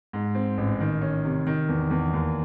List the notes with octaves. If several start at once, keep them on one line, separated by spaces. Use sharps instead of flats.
G#2
C4
A1
D#3
C#4
C3
D#3
E2
E2
D#2